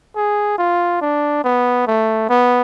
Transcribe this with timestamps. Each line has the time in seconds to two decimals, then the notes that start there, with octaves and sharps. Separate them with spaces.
0.16 G#4
0.58 F4
1.01 D4
1.44 B3
1.87 A3
2.29 B3